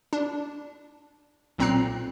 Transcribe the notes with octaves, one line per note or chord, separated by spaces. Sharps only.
D4
B1 A#2 C4 A#5 F#6 C7